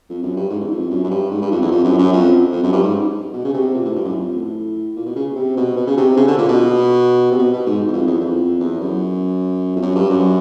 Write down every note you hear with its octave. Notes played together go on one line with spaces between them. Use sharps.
F2
F#2
G2
G#2
E2
F2
F#2
F#2
G2
G#2
G2
F2
E2
F2
F#2
F#2
F2
F2
F#2
G2
G#2
B2
C#3
C3
A#2
A2
G2
F#2
F2
A2
A#2
B2
C#3
C3
B2
B2
C#3
C3
C#3
D3
A#2
B2
C3
B2
B2
G#2
E2
F2
E2
F2
E2
F#2
F2
F#2
G2
F#2